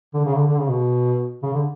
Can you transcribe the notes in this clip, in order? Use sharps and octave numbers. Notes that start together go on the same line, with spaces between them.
D3
C#3
D3
D3
C#3
B2
C#3
D3